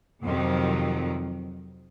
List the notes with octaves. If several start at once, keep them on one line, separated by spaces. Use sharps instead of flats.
F2 C3 D#3 F#3